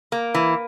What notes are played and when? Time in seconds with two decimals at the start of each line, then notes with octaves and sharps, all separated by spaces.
0.12 A#3
0.34 E3